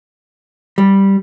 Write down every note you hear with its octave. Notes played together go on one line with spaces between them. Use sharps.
G3